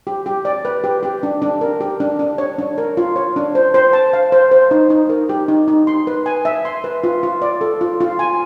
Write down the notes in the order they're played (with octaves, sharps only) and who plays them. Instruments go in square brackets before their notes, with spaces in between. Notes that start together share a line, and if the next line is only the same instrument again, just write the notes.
[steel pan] G4
G4
D5
B4
G4
G4
D4
D4
A#4
G4
D4
D4
C#5
D4
A#4
F4
C#5
D4
C5
C5
A5
F5
C5
C5
D#4
D#4
A#4
G4
D#4
D#4
C6
B4
G#5
E5
C6
B4
F4
F4
D5
A4
F4
F4
G#5